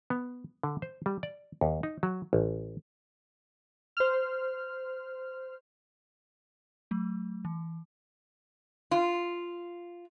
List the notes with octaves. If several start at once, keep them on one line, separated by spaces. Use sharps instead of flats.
B3
D3
C5
G3
D5
D#2
D#4
F#3
A1
C5 F6
F#3 A3
E3
F4